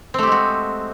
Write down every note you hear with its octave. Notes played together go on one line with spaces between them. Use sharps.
G#3 A3 C4 F#4 G4